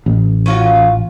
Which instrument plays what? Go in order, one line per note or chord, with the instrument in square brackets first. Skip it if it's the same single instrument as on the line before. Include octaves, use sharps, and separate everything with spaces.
[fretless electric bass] A1
[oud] C#4 F4 F#4